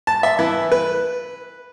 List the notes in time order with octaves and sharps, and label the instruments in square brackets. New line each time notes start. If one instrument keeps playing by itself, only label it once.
[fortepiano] A5
E5
E3
B4